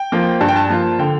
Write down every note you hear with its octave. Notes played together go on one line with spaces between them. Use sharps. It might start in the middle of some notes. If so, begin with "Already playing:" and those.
Already playing: G5
F3 A#3 F4
G2 A5
G5
A5
F3 A#3 F4
D3 G5